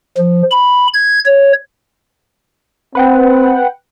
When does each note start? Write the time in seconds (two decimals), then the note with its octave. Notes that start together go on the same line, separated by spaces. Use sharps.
0.17 F3
0.51 B5
0.94 G#6
1.25 C#5
2.95 C4 B4 F#5 G5